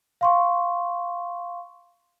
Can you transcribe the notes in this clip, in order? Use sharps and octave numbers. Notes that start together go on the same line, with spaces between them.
F5 C6 C#6